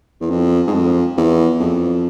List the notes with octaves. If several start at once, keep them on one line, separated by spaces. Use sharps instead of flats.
E2
F2
G#2
F2
E2
F2